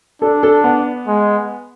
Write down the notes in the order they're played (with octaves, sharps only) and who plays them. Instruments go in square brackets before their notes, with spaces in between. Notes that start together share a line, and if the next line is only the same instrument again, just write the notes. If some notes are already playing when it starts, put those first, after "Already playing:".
[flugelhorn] D4 [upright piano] A4
[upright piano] A4
B3
[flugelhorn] G#3